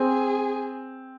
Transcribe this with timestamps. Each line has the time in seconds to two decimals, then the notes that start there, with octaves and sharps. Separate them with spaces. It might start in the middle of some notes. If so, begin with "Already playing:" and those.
Already playing: C4 G#4